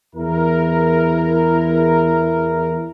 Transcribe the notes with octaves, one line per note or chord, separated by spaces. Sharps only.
E2 E4 A#4